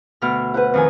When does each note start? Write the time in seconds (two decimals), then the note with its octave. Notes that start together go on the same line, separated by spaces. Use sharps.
0.22 D2 B2 F6
0.54 B4 C5 F#5
0.74 F2 D#3 G#5